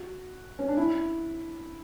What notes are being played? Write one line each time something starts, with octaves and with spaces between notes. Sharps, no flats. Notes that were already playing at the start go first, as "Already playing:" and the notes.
Already playing: F#4
C#4
D4
E4